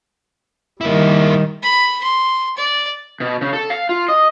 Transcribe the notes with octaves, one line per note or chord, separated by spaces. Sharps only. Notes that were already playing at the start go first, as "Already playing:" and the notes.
D#3 G3 A#3 E4
B5
C6
D5
B2
C#3
A4
F5
F4
D#5